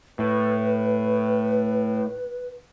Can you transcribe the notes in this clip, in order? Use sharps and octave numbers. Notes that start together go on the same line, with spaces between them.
A2 B4